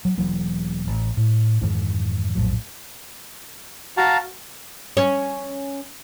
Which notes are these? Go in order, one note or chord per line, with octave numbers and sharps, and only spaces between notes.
F#3
E1 E3 F#3 A#3
A1
A2
F2 G#2 D#3 E3
A#1 F2 A2 F#3
F#4 F5 A5 A#5
C#4